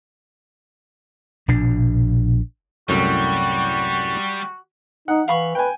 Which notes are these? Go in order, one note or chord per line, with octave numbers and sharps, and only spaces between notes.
A#1 B2 D4
C2 F#2 A2 G3 F#4
D#4 F#5
E3 F5 B5 C#6
B4 G5 G#5